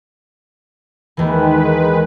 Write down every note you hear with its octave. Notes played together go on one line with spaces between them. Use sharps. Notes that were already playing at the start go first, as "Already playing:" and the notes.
D#2 D#3 E3 G#3 B4